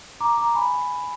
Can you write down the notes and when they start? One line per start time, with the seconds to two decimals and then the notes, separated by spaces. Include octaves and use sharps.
0.20 A#5 D6
0.37 A#5 D6
0.55 G#5 B5